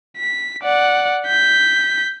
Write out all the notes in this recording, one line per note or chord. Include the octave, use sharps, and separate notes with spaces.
B6
D5 F#5
G6 B6